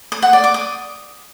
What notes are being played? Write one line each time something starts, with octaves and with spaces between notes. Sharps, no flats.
D#6
F#5
D5
D6
D#6